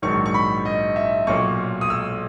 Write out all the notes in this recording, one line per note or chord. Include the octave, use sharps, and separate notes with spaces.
A#1 G#2 D#3 F#3 C#6
C#6
B5
D#5
E5
B1 A#2 F#3 C#6
D#6
E6